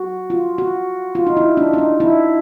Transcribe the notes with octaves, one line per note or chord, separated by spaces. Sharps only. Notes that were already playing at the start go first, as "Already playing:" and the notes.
Already playing: F#4
F4
F#4
F4
D#4
E4
D4
D#4
D4
E4